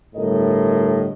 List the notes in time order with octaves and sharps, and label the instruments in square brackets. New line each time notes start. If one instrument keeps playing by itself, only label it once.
[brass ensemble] G1 A2 A#4 D#5